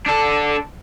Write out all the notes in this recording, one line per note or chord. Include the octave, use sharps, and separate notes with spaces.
D4 A4